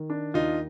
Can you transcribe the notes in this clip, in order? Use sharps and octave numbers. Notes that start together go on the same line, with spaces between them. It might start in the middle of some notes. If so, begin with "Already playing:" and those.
Already playing: D#3
D4
D#2 D#4 F4